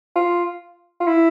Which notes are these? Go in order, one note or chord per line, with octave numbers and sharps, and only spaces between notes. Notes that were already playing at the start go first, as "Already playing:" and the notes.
F4
F4
E4